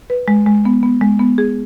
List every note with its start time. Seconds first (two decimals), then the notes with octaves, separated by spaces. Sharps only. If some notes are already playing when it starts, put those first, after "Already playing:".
0.10 B4
0.28 G#3
0.46 G#3
0.65 B3
0.83 B3
1.01 G#3
1.19 B3
1.38 G#4